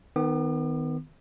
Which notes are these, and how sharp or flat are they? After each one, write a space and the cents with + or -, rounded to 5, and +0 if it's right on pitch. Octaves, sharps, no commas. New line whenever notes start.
D#3 +0 B3 +30 D6 +45